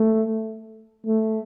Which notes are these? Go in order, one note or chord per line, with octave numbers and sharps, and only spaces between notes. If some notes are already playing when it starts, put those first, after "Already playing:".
Already playing: A3
A3